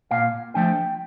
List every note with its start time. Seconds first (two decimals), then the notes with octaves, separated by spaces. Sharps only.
0.11 A#2 F5
0.54 F3 A3 D4 G5